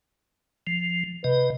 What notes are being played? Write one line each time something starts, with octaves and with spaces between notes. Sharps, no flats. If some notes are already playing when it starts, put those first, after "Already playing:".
F3
C3 B4 D#5